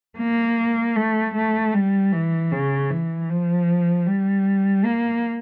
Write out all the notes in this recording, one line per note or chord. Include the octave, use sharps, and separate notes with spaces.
A#3
A3
A3
G3
E3
C#3
E3
F3
G3
A#3